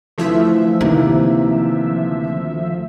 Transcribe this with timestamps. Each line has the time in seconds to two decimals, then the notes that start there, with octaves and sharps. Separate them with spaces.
0.18 D2 E3 F3 A3 E5
0.81 C3 D#3 E3 A#3